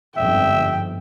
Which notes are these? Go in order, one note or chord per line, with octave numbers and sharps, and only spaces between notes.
G1 F2 G#2 E5 G5